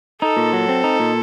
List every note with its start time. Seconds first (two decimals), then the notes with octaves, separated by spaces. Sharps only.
0.22 D#4 A4
0.37 A#2
0.53 F#3
0.69 C4
0.84 D#4
1.00 A#2